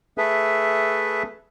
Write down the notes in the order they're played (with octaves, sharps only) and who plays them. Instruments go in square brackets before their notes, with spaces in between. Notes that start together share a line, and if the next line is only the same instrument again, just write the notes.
[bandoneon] A3 G#4 A4 B4 E5